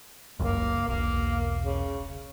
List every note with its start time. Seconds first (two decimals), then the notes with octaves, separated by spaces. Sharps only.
0.39 G1 C#2 F#2 A#3
0.89 E1 B1 A#3
1.63 C#3